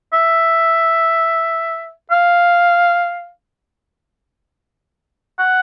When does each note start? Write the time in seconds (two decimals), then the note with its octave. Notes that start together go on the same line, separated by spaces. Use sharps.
0.13 E5
2.11 F5
5.39 F#5